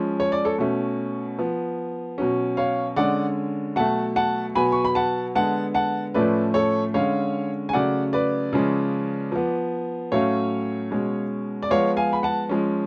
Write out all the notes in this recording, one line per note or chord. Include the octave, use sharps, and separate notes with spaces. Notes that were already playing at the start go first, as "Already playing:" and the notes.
Already playing: F3 G#3 C#4
C#5
D5
A4 C#5
B2 A3 C#4
F3 B3
B2 F#3 C#4
C#5 F5
D3 G#3 C#4 D5 F#5
B2 F#3 A3 F#5 A5
F#5 A5
B2 F#3 B3 G#5 B5
C#6
B5
F#5 A5
D3 G#3 B3 F#5 A5
F#5 A5
A2 F3 A3 C#4 B4 D5
A4 C#5
D3 G#3 C#4 C#5 F5
G#5
C#3 F#3 A3 D5 F#5
B4 D5
C#3 F3 G#3 C#4
F3 B3
A2 F#3 A3 C#4 C#5 F5
B2 G#3 C#4
D5
F3 G#3 B3 C#5 F5
F5 G#5
B5
F#5 A5
F3 G#3 C#4